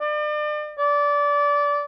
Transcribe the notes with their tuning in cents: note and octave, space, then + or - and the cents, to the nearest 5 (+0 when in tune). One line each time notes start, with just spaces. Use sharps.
D5 +40
D5 -20